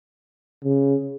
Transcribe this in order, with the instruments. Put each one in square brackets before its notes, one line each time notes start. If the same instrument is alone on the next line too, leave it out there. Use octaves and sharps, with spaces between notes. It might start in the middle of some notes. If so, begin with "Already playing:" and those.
[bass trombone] C#3